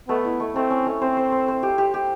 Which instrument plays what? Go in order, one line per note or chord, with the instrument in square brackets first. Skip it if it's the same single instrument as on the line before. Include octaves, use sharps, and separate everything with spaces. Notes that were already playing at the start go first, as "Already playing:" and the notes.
[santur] A3 [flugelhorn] B3
[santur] E4
A3
[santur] A3 [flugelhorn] C4
[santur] C#4
A3
[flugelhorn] C4 [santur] C5
[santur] C5
C5
C5
G4
G4
G4